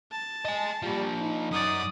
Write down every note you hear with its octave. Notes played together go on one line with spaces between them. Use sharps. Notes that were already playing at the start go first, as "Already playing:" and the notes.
A5
D#5 G#5
F3 G3 A#3
D#4
F#2 D5 D#6